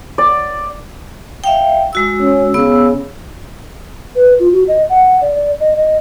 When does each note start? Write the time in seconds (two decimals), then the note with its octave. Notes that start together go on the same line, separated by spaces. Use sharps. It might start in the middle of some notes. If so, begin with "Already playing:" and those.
0.18 D5
1.44 E5 F5 G5
1.93 G#3 F#4 E6
2.22 C#4
2.54 C#3 B3 E6
4.15 B4
4.40 F4
4.52 F#4
4.68 D#5
4.89 F#5
5.21 D5
5.35 D5
5.60 D#5
5.76 D#5